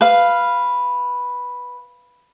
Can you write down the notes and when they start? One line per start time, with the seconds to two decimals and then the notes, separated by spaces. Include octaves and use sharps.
0.01 B4 F5